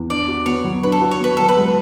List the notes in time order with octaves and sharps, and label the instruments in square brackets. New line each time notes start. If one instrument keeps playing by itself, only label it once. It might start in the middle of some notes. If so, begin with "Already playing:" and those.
Already playing: [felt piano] E2
[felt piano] D4 [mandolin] D5
[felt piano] F#4
[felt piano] B3 [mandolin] C#5
[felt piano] F#3
[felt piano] D4 [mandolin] B4
[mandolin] A4
[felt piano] F#4
[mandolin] C#5
[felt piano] B3 [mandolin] B4
[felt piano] F#3 [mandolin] A4
[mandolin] B4
[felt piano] G#3